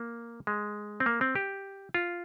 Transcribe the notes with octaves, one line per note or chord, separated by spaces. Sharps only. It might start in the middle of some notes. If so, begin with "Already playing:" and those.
Already playing: A#3
G#3
C4
A#3
C4
G4
F4